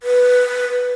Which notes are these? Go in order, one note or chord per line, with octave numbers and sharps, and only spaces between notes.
B4